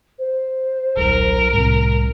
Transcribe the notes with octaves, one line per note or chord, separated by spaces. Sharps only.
C5
D#1 B1 A#4
C2 A2 C3